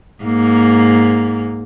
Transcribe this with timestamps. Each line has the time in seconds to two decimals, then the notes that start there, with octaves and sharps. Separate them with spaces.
0.24 G#2 A#3